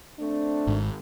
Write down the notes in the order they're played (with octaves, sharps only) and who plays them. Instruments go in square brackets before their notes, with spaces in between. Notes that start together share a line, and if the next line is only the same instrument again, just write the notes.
[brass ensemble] A3 C4 D4
[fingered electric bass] G#1 G#2